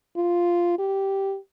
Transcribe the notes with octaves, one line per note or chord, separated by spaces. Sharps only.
F4
G4